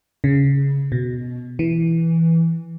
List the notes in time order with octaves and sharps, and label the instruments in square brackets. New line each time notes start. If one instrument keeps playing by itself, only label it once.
[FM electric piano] C#3
B2
E3